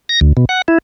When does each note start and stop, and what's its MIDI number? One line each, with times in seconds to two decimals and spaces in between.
0.09 0.20 94
0.21 0.33 38
0.37 0.45 47
0.49 0.62 78
0.68 0.78 64